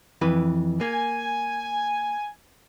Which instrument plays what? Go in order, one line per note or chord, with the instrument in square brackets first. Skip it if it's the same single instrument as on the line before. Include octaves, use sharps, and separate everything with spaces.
[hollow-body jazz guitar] F2 E3 B4
[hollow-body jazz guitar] A#3 [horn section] G#5